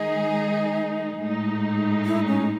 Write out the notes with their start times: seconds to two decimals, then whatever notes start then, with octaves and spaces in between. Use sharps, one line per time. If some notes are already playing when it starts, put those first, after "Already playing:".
Already playing: D#3 G#3 D#4 G#4 D#5
1.21 A2 G#3 D#4
2.06 E4
2.27 C#4